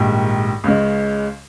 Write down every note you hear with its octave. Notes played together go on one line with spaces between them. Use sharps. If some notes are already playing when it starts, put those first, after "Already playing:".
Already playing: A#1 G#2 D#3 G3
C#2 C#3 G#3